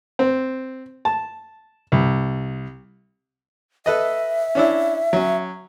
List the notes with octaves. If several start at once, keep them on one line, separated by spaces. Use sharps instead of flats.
C4
A5
C2
A4 B4 D#5 E5
C#4 D4 E4
F#3 C#4